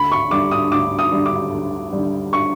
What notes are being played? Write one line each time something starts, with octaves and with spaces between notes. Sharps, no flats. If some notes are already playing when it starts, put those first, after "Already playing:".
Already playing: D2 B5
C#6
D3 G3 D6
D#6
D2 D6
D#6
D3 G3
D6
D2
D3 G3
C#6